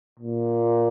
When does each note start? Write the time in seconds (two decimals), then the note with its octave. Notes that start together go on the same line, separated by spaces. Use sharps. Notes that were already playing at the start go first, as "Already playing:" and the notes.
0.19 A#2